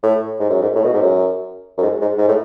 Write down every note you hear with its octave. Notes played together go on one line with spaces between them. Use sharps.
A2
G#2
F#2
G#2
A2
B2
G#2
F#2
F#2
G#2
G#2
G#2
A2